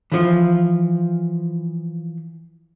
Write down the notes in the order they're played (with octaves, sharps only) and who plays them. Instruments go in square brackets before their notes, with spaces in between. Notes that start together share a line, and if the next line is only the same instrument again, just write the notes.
[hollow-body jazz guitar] E3 F3